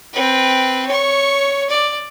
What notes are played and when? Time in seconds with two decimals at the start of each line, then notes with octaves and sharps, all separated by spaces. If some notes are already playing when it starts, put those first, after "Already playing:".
0.13 C4 B4
0.87 C#5 C#6
1.70 D5